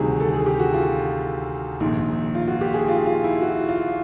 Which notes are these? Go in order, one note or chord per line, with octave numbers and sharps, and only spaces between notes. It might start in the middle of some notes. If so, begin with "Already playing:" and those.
Already playing: D2 C3 D#3 G3 F#4 G#4
A4
G#4
G4
F#4
F4
A#1 G#2 D#3
F4
F#4
G4
G#4
F4
F4
E4
F#4
F4